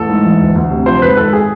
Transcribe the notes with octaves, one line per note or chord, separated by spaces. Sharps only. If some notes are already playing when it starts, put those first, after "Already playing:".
Already playing: A1 A4
G#2
E3
D2
D2
C3
F3 C5
G#1 B4
G#1 A4
G#4